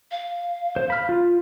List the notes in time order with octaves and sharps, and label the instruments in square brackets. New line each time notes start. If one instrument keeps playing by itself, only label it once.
[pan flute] F5
[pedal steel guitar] C5
B5 F6
F4